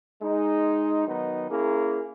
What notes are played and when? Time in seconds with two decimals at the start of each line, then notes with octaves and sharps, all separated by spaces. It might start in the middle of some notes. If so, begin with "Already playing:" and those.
0.21 G#3 D#4
1.07 D#3 F#3 B3 D#4
1.50 A#3 C#4 E4 G#4